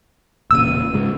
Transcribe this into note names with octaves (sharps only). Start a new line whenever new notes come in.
E1 A#2 C#3 E6 D#7
G#2 C#3 G#3